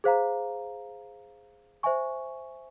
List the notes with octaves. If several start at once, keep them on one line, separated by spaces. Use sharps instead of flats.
G#4 C5 F5 A#5
C5 E5 G#5 C#6